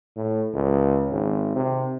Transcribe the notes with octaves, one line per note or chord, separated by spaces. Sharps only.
A2
C#2
G#1
C3